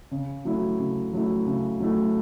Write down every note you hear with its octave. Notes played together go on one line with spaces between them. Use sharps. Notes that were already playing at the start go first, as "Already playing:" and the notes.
C#3
F#3 A3 E4
C#3
F#3 A3 E4
C#3
F#3 A3 E4